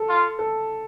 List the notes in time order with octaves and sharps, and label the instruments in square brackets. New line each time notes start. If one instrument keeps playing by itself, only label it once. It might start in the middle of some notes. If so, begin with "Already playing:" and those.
Already playing: [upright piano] A4
[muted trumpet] F4
[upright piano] A4